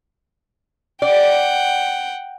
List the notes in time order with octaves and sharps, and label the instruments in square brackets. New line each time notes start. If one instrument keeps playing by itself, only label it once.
[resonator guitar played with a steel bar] D5 [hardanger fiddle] F#5 G5